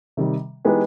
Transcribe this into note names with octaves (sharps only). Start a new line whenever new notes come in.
C3 D#3 G3
E3 G#3 B3 D#4 G4